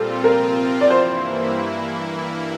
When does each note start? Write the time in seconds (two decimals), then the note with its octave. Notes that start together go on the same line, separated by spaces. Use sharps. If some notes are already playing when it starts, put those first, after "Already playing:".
Already playing: A#2 G3 C4 F4 A4
0.24 C3 F3 C4 F4 A#4
0.81 D5
0.90 G2 E3 A#3 E4 C5